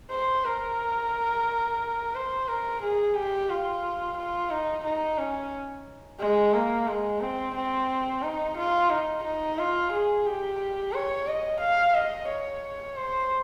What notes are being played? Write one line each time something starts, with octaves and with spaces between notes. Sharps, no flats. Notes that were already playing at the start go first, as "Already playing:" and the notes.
C5
A#4
C5
A#4
G#4
G4
F4
F4
D#4
D#4
C#4
G#3
A#3
G#3
C4
C4
D#4
F4
D#4
D#4
F4
G#4
G4
C#5
D#5
F5
D#5
C#5
C5